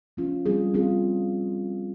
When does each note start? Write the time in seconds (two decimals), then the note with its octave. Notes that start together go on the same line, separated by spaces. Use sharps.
0.17 F3 A3 C#4 F4
0.46 G3 C4 F4 G#4
0.74 G3 C4 F4 G#4